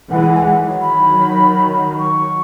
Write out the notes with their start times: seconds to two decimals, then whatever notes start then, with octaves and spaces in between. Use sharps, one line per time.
0.11 E3 G#3 F#5
0.35 G#5
0.40 F#5
0.58 D#3 F#3
0.81 B5
1.99 C#6